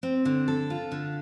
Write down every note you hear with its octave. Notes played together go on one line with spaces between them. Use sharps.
C4
D3
A4
F4
D3